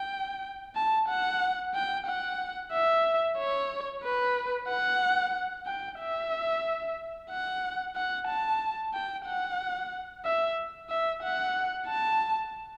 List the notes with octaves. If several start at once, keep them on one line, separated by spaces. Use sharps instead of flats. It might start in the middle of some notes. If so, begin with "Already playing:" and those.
Already playing: G5
A5
F#5
G5
F#5
E5
C#5
B4
F#5
G5
E5
F#5
F#5
A5
G5
F#5
E5
E5
F#5
A5